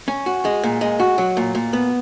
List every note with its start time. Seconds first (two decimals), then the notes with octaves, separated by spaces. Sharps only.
0.08 C#4
0.26 F#4
0.45 G#3
0.63 A#2
0.81 G#3
1.00 F#4
1.18 F#3
1.37 A#2
1.55 A#2
1.73 B3